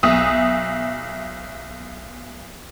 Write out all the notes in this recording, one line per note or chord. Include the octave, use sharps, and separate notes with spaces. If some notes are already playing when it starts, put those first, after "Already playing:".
B1 E5 D#6